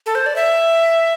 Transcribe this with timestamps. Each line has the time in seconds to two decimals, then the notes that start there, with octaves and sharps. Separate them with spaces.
0.06 A4
0.15 C5
0.26 D5
0.36 E5